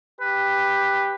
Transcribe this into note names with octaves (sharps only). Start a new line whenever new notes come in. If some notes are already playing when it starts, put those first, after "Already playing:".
G4 B4